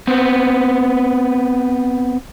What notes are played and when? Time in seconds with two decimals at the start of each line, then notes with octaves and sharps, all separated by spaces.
0.07 B3 C4